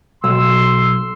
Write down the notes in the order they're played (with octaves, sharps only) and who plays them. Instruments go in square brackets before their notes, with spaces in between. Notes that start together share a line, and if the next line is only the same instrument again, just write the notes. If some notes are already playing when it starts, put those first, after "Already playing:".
[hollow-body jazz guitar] B1 [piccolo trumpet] C6 [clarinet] E6